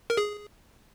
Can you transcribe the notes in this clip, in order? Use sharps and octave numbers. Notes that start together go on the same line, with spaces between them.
A#4
G#4